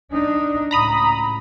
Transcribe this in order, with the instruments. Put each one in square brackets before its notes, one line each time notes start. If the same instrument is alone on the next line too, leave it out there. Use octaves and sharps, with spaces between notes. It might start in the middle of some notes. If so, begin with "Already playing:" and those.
[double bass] D4 D#4
[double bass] C#2 A2 [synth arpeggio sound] A#5 B5 D#6